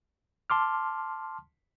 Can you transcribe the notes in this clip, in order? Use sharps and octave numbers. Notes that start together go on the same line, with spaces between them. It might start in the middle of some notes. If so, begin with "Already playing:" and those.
A5 C6 D6 F6